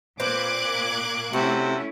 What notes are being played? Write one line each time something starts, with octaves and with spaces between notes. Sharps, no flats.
A#2 A#3 C4 B4 D6 F#6 G#6
C3 A3 C#4 E4 F#4